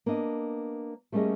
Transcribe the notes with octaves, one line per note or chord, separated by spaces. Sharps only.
A#3 B3 D4 D#5
G3 A3 A#3 C#4 G#4 D#5